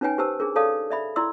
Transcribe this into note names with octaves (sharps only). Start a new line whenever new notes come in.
C#4 D#4 B4 C#5 G5 G#5
G4 B4 C5 A5 E6
D4 G#4 A#4
A4 C#5 D5 F5 A5 D#6
D5 E5 B5
E4 D5 C6 E6